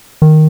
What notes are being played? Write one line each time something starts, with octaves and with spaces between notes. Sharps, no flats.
D#3